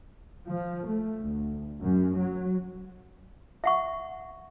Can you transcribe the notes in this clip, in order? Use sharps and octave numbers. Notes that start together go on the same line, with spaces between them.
F3
A3
D2
F#2
F#3
E5 F#5 C#6